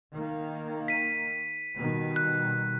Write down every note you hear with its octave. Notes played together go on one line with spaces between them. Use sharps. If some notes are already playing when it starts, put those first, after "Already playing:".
D#3 A#3
B6 D#7
B2 D#3 G3
F#6